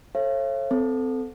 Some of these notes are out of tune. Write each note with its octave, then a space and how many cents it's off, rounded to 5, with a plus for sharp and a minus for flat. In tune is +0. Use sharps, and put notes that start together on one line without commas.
A4 +0 C#5 -40 F5 -45
C4 -25 A4 +0